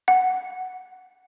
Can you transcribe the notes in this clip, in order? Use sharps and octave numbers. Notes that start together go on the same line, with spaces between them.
F#5